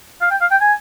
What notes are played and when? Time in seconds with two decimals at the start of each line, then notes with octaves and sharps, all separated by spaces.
0.21 F5
0.31 G5
0.41 F5
0.51 G5
0.61 G#5